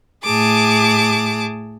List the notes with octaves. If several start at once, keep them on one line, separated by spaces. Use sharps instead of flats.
A2 G#4 A5 D6